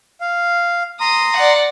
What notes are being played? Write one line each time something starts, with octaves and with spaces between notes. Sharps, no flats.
F5
A#5 C6 D#6
D5 F#5